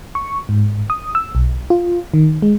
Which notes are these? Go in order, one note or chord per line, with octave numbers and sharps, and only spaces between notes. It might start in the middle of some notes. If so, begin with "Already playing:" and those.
C#6
G#2
D#6
E6
B1
F4
D#3
G#3